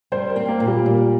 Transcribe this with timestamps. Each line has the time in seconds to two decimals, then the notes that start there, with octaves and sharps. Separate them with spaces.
0.12 G3 C5
0.29 A#4
0.36 C4
0.48 A#3
0.60 A#2
0.67 G3
0.86 A#2